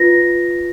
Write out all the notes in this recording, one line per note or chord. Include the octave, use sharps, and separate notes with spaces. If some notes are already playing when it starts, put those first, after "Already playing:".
Already playing: F4 B4 A#6